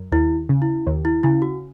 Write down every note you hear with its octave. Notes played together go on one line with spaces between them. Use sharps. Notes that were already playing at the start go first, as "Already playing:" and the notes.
Already playing: F#2
D#2 E4
C#3
E4
D#2
E4
C#3 E4
F#4